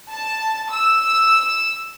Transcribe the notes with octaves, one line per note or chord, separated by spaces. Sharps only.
A5
E6